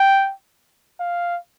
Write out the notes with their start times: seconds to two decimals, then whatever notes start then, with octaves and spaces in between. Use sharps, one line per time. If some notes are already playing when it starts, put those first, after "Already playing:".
Already playing: G5
1.00 F5